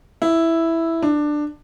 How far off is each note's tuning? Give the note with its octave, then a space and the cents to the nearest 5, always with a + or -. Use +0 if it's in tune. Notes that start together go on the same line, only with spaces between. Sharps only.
E4 +0
D4 +15